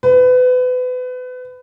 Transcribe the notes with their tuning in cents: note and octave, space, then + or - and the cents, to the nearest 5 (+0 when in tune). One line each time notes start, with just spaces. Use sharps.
B4 +30